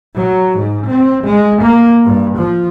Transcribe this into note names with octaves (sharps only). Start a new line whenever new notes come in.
F#3
G#2
C4
G#3
A#3
G2
F3